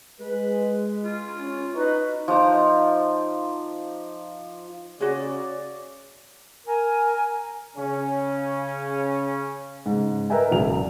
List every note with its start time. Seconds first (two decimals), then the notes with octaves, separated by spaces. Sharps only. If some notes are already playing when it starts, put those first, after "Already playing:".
0.20 G#3 B4
1.04 F4
1.37 C#4
1.75 D#4 F#4 B4
2.28 F3 D#4 A#5 D6
5.00 C#3 F#4 G#4 D5
6.67 A#4 G#5
7.76 C#3 C#4
9.86 G#2 C#3
10.30 A#4 B4 D#5 E5 G5 G#5
10.52 E1 C#3 F#3 F7